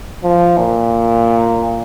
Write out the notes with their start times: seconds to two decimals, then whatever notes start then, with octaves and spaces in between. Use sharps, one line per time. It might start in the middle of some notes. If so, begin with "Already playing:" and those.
0.24 F3
0.58 A#2